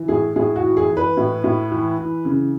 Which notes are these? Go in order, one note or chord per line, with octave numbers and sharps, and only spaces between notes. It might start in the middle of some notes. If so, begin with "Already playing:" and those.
Already playing: E3
A2 G#4
A2 G#4
F#4
E3
G#4
E3
B4
A2
A2
E3
E3
C#3